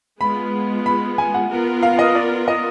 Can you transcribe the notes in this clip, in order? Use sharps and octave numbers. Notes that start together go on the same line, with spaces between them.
G#3 B3 F4 B5
B5
G#5
F#5
B3 F4 A#4
F5
D#5
D5
D#5